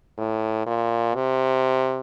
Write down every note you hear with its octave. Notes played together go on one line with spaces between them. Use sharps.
A2
A#2
C3